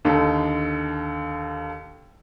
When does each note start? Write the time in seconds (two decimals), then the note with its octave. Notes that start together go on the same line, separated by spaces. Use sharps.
0.05 D#2 D3 D#4 A4